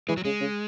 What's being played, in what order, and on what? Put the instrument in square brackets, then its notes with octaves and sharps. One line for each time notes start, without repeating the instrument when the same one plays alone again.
[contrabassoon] E3 [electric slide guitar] G#3
[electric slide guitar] F#3
[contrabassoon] C#3 [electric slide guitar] G#3
[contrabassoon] C#3